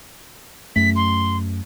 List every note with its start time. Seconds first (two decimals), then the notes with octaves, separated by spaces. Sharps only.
0.76 F#2 A3 B6
0.96 C6